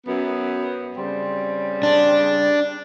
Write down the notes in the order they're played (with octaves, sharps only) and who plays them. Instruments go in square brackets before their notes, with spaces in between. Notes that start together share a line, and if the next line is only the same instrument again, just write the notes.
[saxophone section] F#2 B3
C#3 G3 C4
[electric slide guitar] D4